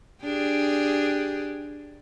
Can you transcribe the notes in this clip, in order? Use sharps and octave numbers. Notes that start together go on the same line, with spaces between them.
D4 G4 G#4